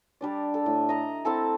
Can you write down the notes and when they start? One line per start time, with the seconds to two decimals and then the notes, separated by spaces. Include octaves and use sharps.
0.21 G3 D4 D5
0.54 A4
0.66 A2
0.89 D#5 A#5
1.25 C4 E4 A4 A5